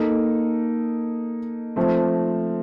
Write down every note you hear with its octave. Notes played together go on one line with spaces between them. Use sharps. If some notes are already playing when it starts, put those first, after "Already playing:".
Already playing: A#3 D#4 A4
F3 A3 C4